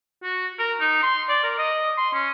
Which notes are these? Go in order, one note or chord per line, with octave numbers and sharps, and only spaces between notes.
F#4
A#4
D#4
C6
D5
A#4
D#5
C6
C#4